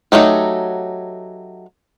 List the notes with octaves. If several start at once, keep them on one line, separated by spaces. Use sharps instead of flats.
F#3 A3 D#4 G4